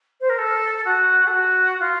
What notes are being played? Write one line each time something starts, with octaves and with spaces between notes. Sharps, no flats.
C5
A#4
A4
F#4
A4
F#4
F4